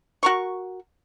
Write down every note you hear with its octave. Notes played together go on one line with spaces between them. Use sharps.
F#4 A#4 C#6